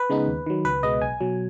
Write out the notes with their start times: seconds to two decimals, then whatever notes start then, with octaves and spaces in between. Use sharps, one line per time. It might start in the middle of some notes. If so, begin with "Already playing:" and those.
Already playing: B4
0.10 C#3 G#3 B3 D#4
0.28 D#2
0.46 D#3 F#3
0.65 C#2 B4
0.83 B2 G#3 B3 D#5
1.02 B1 G#5
1.21 B2 F#3